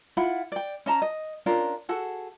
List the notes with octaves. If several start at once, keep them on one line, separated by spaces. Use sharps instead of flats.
E4 F4 F#5 B5
D5 G5
C#4 D#5 A5 A#5
D#5
C#4 D4 F4 A#4
F#4 G#4 A4 F#5